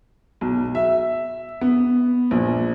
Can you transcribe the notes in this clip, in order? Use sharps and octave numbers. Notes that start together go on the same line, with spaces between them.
B1
E5
B3
A#1